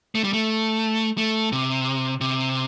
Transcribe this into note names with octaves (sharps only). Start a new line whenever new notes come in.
A3
G3
A3
A3
C3
C3